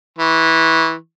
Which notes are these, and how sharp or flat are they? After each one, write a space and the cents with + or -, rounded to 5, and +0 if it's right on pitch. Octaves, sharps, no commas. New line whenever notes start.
E3 -15 C#6 -35